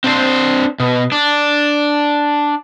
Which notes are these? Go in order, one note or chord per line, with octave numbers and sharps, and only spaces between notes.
C4 D4 C5
B2
D4